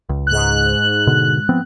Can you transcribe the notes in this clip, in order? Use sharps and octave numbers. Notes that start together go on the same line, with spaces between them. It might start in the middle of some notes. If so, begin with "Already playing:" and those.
C#2
G#2 F#6
B2 D3
F3 B3 C4